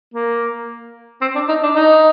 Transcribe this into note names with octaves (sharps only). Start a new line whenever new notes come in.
A#3
C4
D4
D#4
D4
D#4